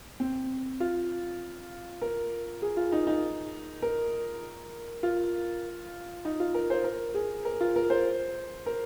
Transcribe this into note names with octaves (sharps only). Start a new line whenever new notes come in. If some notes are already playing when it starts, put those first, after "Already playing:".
C4
F4
A#4
G#4
F4
D#4
D#4
A#4
F4
D#4
F4
A#4
C5
A#4
G#4
A#4
F4
A#4
C5
A#4